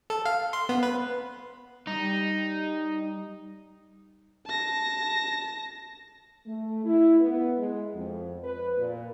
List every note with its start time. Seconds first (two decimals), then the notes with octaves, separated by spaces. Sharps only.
0.10 A4
0.25 F5
0.53 C6
0.69 B3
0.83 B4
1.87 G3 D#4
4.46 A5 A#6
6.47 A3
6.84 E4
7.20 B3
7.58 G#3
7.94 F2
8.44 B4
8.78 A#2